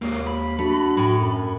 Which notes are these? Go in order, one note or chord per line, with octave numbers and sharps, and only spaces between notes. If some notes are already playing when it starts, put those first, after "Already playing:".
D#2 G#2 A#3
B5
A3 D4 F#4
A2 G#5
F#2 B5